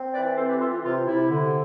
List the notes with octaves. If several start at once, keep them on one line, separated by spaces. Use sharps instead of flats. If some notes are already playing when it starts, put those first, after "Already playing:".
Already playing: C4
E3 B4 D5
C4 A4 C5
G4 B4
E3 F4 A4
F4
C3 F4
C3 E4
D3